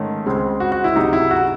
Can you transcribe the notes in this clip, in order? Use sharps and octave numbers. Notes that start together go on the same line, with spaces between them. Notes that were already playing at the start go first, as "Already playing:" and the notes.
Already playing: G#2 D#3 A3 C#4
C#2 C#3 G#3 C4
F#4
F#4
E4
C#2 C3 F#3 D#4
E4
F#4